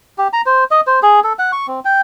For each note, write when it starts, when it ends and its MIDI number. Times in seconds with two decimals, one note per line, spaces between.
0.18 0.28 67
0.33 0.41 82
0.46 0.64 72
0.71 0.81 75
0.87 1.00 72
1.02 1.20 68
1.24 1.33 69
1.39 1.52 78
1.52 1.67 85
1.67 1.80 60
1.85 2.01 79